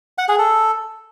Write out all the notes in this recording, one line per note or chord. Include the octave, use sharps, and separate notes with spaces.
F#5
G#4
A4